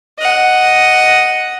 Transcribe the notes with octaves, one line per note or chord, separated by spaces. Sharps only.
D#5 F#5